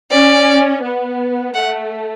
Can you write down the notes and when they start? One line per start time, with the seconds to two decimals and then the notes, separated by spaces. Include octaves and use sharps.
0.11 C#4 D5
0.82 B3
1.54 A3 F#5